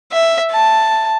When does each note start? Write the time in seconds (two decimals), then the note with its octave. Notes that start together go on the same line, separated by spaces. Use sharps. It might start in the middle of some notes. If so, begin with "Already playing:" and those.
0.13 E5
0.51 A5